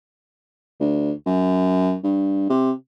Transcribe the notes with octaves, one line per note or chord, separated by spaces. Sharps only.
D2
F#2
G2
C3